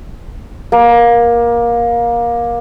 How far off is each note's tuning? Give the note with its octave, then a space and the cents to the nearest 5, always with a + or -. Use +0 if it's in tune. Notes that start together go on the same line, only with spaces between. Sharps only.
A#3 +20